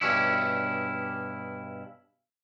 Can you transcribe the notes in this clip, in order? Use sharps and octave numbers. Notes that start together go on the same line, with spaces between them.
G2 B2 C#4 D4 E4